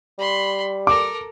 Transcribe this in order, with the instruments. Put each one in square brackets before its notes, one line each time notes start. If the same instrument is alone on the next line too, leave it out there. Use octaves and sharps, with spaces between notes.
[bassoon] G3 [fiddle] B5 C6
[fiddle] A4 A#4 [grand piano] D6